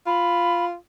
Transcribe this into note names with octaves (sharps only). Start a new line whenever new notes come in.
F4 B5